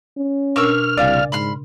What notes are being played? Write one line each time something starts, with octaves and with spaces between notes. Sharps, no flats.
C#4
B2 D4 A#4 C#6 D6 E6 F6
C2 C#3 D5 F5 G#5
G#2 B5 C6 F6